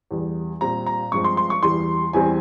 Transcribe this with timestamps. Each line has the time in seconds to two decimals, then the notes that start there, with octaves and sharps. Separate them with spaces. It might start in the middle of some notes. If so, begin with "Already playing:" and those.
0.11 E2 E3 G3
0.61 A#2 G3 C4 A#5
0.86 A#5
1.12 G2 F3 G#3 C4 C#6
1.24 C6
1.37 C6
1.50 C#6
1.63 E2 E3 G3 C6
2.13 E2 E3 G3 C4 G#5